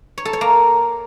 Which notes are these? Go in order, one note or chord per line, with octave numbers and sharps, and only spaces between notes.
C#5
A4
C#5
A#3